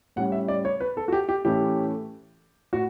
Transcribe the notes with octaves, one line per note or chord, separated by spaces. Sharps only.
A2 G3 C#4 F#5
E5
D5
C#5
B4
A4
F#4
G4
G4
A2 E3 A3 C#4 G4
A2 F#4